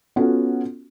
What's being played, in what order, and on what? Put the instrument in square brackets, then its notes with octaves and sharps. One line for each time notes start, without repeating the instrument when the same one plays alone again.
[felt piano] B3 C#4 F4 F#4 A4